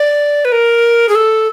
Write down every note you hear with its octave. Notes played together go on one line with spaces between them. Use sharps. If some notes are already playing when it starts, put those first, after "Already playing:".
Already playing: D5
B4
A#4
G#4
A4